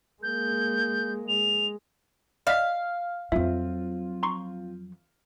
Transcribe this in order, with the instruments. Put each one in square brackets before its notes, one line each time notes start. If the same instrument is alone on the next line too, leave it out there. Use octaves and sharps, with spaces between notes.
[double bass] G#3 A#3 [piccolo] G6
[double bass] G#3 [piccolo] F7
[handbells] D5 D#5 B6 [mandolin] F5
[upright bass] F2 F#3 [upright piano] C4 F4 [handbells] E5
[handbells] A#5 C6 C#6